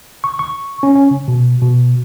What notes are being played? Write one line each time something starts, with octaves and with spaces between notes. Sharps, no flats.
C#6
C#6
C#4
C#4
C#3
B2
B2